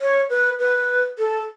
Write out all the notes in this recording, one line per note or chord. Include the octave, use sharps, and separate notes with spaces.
C#5
B4
B4
A4